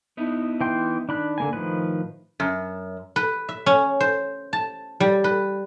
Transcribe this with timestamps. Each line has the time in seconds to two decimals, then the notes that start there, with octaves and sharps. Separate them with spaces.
0.17 B3 D#4 E4
0.61 E3 G5 C6
1.09 D#3 D4 B5 F#6
1.38 D3 A#3 G#5
1.53 A2 D#3 F3 B4
2.40 F#2
3.16 B4
3.49 E5
3.66 C#4
4.00 C5
4.53 A5
5.00 G3
5.24 B4